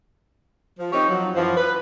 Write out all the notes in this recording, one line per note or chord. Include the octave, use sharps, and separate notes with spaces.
F3
C4 C#4 D#4 G4 C#5
F3 F#3
F#2 E3 F3
B4